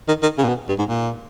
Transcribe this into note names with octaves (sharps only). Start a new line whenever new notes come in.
D#3
D#3
C#3
A#2
B2
G2
G#2
A#2